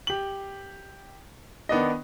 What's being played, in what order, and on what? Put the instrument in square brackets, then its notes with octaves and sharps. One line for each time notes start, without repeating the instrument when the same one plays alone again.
[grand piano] G4 F#7
D#3 B3 D4 D#5